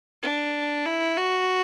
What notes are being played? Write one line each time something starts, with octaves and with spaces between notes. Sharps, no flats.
D4
E4
F#4